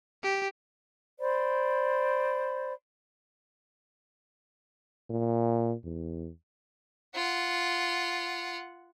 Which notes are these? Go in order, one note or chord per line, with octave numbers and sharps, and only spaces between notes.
G4
C5 D5 B5
A#2
E2
F4 F#5